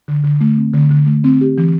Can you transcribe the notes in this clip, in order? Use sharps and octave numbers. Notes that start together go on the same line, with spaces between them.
D3
D3
A3
C4
D3
D3
A3
C4
G4
E3